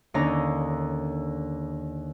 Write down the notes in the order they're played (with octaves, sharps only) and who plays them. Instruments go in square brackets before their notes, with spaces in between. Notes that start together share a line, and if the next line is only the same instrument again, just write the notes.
[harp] D#2 D3 C#4 D#4 A#5